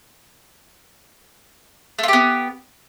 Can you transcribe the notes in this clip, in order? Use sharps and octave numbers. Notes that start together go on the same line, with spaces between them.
A3 B3 F4 G4